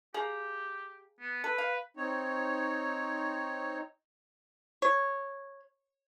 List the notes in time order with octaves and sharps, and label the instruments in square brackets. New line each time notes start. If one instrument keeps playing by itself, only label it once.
[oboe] G4 [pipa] G#4 F5 A#5
[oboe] B3
[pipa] A4 [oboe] B4
[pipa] F5
[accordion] C4 D#4 C#5
[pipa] C#5